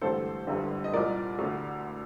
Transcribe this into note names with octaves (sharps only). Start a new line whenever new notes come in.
A1 G2 D3 A4 C5
G1 G2 D3
D#5
C2 A#2 A#4 D5
D2 D3